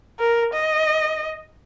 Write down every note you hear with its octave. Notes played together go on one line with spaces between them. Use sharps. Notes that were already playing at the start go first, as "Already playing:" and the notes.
A#4
D#5